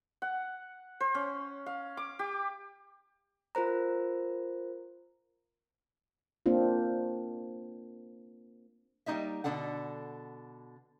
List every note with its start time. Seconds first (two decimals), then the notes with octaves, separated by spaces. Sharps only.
0.22 F#5
1.00 C5
1.15 C#4
1.66 F5
1.97 D6
2.19 G4
3.55 F4 A#4 C5 A#5
6.46 A#3 C4 D4 F4
9.06 G3 A#3 B3 D#4 D#5 E5
9.44 B2 D3 D4 A4 F#5